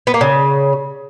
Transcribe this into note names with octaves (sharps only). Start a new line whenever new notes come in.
B3
A#3
C#3